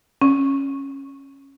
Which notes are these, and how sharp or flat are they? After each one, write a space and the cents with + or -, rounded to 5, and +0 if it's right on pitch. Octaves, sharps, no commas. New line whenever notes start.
C#4 -15